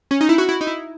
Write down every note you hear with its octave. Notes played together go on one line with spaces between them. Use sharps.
C#4
D#4
E4
F#4
E4
D#4
E4